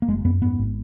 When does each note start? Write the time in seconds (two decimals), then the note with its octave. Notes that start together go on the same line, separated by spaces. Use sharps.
0.02 A#3
0.08 F#1 G#3
0.25 F#2 B3
0.42 G#2 B3
0.58 G#1